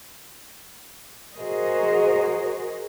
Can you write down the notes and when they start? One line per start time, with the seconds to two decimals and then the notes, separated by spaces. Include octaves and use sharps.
1.35 F#4 G#4 A#4 C5 D#5